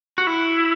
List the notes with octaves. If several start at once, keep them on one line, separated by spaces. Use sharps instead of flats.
F#4
E4